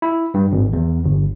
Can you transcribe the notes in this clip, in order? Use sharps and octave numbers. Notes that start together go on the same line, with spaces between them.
E4
G2
G#1
E2
G1